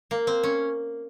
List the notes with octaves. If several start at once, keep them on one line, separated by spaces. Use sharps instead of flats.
A#3
C4
C#4